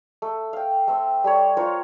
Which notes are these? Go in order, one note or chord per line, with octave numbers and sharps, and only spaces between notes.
A3
F5 G5
A3 C4
G3 A3 C#5
F4 A#4 C5 C#5